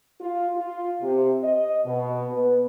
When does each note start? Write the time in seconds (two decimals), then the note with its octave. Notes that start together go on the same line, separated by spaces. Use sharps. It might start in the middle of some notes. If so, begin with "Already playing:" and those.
0.20 F4
0.55 F4
1.02 C3
1.43 D#5
1.85 B2
2.30 B3